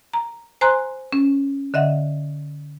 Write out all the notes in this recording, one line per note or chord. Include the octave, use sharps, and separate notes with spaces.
A#5
C5 G#5 A#5 C6 F#6
C#4
D3 D#5 E5 F#5